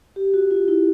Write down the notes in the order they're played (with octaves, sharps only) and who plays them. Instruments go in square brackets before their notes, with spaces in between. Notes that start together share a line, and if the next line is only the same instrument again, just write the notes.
[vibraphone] G4
F#4
F4
E4